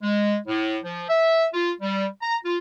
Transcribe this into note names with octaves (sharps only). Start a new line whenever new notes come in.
G#3
A2
F3
E5
F4
G3
A#5
F4